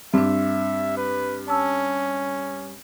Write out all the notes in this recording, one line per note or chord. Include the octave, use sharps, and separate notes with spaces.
G2 C4 D4 E5
B4
C#4 A5 E6